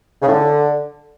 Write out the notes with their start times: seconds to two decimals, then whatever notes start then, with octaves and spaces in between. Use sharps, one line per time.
0.22 C#3
0.27 A2
0.33 D3